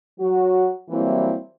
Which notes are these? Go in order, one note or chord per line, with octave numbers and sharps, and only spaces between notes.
F#3 F#4
E3 F#3 G3 A#3 C4 E4